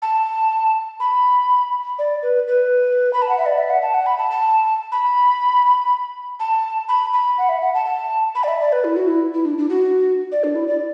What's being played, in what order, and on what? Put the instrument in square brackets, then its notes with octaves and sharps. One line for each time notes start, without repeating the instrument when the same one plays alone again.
[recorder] A5
B5
D5
B4
B4
B5
A5
F#5
E5
D5
E5
F#5
A5
F#5
B5
A5
A5
B5
A5
B5
B5
F#5
E5
F#5
A5
A5
B5
D5
E5
D5
B4
E4
F#4
E4
E4
D4
D4
F#4
D5
D4
E4
D5